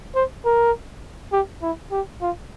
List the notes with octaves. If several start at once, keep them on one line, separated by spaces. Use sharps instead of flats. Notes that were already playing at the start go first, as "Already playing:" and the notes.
C5
A#4
G4
E4
G4
F4